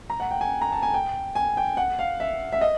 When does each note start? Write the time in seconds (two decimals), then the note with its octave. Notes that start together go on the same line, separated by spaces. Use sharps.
0.10 A#5
0.20 F#5
0.31 G5
0.41 G#5
0.61 A#5
0.72 A5
0.83 G#5
0.94 G5
1.35 G#5
1.57 G5
1.77 F#5
1.99 F5
2.20 E5
2.52 E5
2.61 D#5